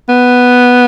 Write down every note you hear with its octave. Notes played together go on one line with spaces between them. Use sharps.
B3